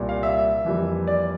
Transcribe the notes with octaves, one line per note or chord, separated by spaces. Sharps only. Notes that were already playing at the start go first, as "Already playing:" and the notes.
Already playing: C2 A#2 G3
F5
E5
F2 E3 G3 A#3
D5